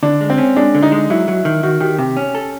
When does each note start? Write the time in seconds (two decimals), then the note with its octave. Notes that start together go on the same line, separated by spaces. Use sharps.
0.03 D3 D4
0.21 G#3
0.30 C4
0.38 C#4
0.56 G#3 D4
0.75 D3
0.83 D#4
0.92 G#3
1.10 F#3 E4
1.28 F#3
1.45 D#3
1.63 D#3 F#4
1.80 D#3 G4
1.99 C3 G4
2.17 C#4
2.35 A4